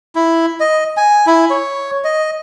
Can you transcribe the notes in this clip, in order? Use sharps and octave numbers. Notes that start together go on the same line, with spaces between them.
E4
D#5
G#5
E4
C#5
D#5